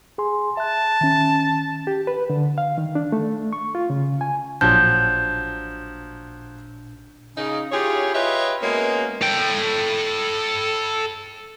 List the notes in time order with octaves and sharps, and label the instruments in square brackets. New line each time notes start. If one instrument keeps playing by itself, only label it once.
[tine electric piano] G#4 G#5 C6
[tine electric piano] E5 F#6 [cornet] A5
[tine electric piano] D#3 C#4
[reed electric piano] G4
B4
D3
F5
D#3
D4
A3
C#6
F4
C#3
G#5
[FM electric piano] A1 A#2 D4 [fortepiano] F3 F#3 [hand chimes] G6
[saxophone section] C#3 D#4
E4 F4 G4 G#4 C#5
F4 G4 B4 C#5 D#5 E5
G#3 A#3 B3 C#4 F#4 D#5
[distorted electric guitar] A4 G5